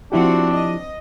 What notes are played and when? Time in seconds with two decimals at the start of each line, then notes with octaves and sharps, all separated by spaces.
0.12 F3 C4 D4 E4 F#4 G4
0.52 D#5